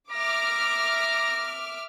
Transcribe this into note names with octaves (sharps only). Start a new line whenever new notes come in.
E5 A#5 D6 F6